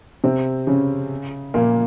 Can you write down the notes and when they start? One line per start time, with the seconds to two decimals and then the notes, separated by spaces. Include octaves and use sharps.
0.24 C3 C4
0.67 C#3 C#4
1.54 A#2 A#3